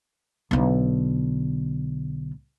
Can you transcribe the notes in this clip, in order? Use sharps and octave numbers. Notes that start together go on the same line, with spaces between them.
B1 D3